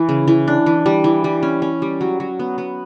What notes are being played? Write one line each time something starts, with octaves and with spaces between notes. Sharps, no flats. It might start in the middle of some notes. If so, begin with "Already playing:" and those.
Already playing: E3
C#3
E3
D4
E3
G3
E3
G3
C#4
C#4
G3
F#3
F#3
B3
B3